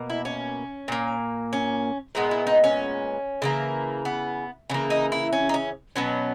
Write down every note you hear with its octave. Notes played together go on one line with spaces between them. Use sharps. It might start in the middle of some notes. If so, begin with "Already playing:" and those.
Already playing: B2 A#3
E4
C#4
A#2 A#3
C#4
A#2 G#3 B3 D#4
E4
D#4
C#4
C#3 E3 A#3
B3
C#3 E3 A#3 C#4
D#4
E4
C#4
D#4
C#4
B2 F#3 B3 C#4